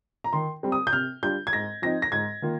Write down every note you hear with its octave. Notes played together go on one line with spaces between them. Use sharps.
A#5
D#3 C6
G3 C4
D#6
G6
C3 F6
G3 D4 F4 G6
G#6
G#2 A#6
F3 C4 D#4 A#6
A#6
G#2 G#6
D#3 A#3 F4